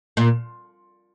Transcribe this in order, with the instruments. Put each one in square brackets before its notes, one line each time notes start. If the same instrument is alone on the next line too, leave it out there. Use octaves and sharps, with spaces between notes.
[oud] A#2